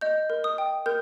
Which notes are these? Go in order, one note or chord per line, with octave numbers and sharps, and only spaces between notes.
D#5 G6
A#4
D#6
G5
A#4 G6